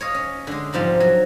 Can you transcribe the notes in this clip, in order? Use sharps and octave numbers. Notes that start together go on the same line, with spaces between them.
C#5 D#5 F5
C#4
D3 G#3
G#2 C3 F3 G3
F#3